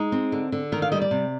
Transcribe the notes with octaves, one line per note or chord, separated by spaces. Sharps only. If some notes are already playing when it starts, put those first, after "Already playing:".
Already playing: G#3 D#4
C4
D3
D3
D#3 A#4
F5
G3 D#5
D5
C3